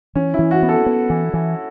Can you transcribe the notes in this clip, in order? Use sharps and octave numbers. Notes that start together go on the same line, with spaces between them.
E3 C#4
E3 E4
F#4
B3
A4
B3
E3
E3